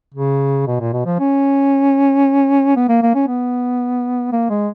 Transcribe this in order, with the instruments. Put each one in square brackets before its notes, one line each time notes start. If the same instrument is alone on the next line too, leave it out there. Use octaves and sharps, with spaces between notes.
[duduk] C#3
B2
A#2
B2
F3
C#4
B3
A#3
A#3
C#4
B3
A#3
G#3